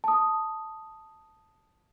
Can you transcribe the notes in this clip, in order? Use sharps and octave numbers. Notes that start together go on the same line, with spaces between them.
A5 D#6